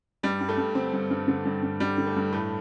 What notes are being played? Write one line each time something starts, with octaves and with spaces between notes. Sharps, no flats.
G2 G3
G2
A3
G2
D3 C4
G2
G2
D3
G2
G2
D3 G3
D3
A3
G2
A2 A3